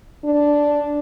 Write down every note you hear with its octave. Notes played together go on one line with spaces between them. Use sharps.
D4